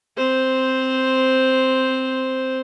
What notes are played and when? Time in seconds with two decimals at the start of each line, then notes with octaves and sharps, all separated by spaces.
0.17 C4 C5